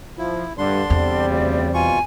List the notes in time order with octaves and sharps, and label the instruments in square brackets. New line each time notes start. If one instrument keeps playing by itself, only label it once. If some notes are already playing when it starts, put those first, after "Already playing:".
[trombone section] F3 [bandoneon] E4
[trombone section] G2 [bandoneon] D3 D4 C6 [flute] D5
[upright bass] E2 [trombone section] C3 G3 C4
[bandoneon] D2 C#3
[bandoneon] B2 F4 C#6 [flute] G#5